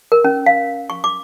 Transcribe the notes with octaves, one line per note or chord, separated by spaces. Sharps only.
A#4
C#4
F5
C#6
D6